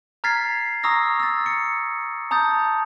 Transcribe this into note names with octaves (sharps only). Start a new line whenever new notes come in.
A#5 F6 G#6 A6 B6 C7
A#5 C#6 D#6 E6 A#6
E6 A6
C#7
A5 A#5 D#6 G6 A6